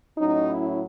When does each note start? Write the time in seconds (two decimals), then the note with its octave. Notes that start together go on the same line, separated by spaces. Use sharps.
0.18 A2 F#3 C#4 D#4
0.49 E4